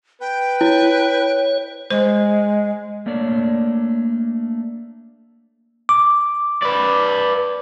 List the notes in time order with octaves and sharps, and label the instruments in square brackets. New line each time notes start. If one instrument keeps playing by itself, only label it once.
[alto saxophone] B4 [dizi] G5
[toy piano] E4 [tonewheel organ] C#5
[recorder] G#3 [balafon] C5
[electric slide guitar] A3 A#3 D4 C#5 D5
[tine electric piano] D6
[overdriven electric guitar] B4 D5